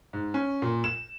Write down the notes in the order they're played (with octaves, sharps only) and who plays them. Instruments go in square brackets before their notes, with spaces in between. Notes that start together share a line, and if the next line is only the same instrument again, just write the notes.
[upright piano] G#2
C#4
A#2
E7